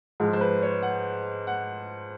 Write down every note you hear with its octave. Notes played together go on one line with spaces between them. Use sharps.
G#2 F3 G#3
C5
B4
C#5
F#5
F#5